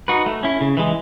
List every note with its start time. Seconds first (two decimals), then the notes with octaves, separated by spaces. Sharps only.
0.08 D#4 F#4 B4
0.26 A3
0.43 C#4 E4
0.61 C#3
0.77 E3 G#3